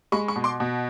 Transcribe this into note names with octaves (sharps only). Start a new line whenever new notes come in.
G#3 B5 C#6
B5 C#6
B2
C6 D6
B2